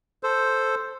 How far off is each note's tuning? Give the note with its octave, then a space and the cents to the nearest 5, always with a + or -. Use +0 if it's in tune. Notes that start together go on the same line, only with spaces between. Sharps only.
A4 +0 C5 +0